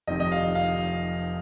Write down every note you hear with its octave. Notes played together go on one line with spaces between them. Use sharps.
F1 F2 C3 D#3 D#5
D#5
F5
F5